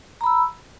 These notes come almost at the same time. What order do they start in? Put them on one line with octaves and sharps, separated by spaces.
A#5 B5 E6